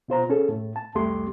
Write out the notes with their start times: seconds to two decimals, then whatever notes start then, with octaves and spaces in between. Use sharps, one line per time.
0.08 B2 F4 C5 A#5
0.29 C#4 G#4 A4
0.49 A2
0.76 A5
0.95 C2 F2 G3 A3 G4 C6